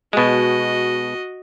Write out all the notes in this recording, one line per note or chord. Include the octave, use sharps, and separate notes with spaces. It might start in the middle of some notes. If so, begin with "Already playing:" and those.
B2 G#3 F#4 D#5